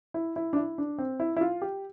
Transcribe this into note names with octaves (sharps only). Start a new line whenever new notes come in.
E4
E4
D4
E4
D4
C4
E4
E4
F4
G4